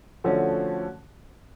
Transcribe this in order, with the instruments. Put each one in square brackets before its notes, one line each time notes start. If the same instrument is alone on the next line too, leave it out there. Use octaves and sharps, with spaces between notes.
[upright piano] D3 F3 A3 C#4 F#4